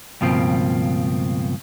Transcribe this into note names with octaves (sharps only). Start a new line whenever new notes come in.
C#2 G2 B2 F3 A#3 C4